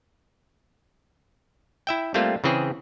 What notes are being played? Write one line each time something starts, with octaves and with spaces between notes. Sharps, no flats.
E4 E5 G5
G3 A3 A#3 C4 F4
C#3 E3 C4 G#4